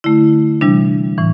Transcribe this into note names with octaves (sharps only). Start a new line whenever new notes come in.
D3 A3 E4
C3 E3 G3 D4
A2 E3